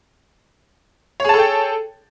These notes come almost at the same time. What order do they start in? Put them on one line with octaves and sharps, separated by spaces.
C#5 G#4 A5 A4 G5